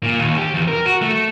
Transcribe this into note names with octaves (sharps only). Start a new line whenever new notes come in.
A#2
D#2
G4
E2
A#4
F#4
A3